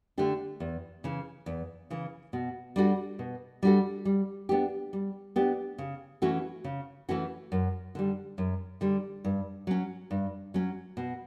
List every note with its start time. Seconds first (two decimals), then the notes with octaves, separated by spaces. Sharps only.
0.18 D3 A3 D4 G4
0.60 E2
1.04 C#3 E3
1.46 E2
1.90 C#3 E3
2.33 B2
2.76 G3 D4 F#4 A4
3.19 B2
3.63 G3 D4 F#4 A4
4.05 G3
4.49 B3 D4 G4
4.93 G3
5.36 B3 D4 G4
5.78 C#3
6.22 E3 A3 C#4 F#4
6.64 C#3
7.09 E3 A3 C#4 F#4
7.52 F#2
7.95 D3 G3
8.38 F#2
8.81 D3 G3
9.25 G2
9.67 F#3 C#4
10.11 G2
10.54 F#3 C#4
10.97 B2